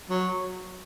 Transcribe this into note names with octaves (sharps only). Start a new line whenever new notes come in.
F#3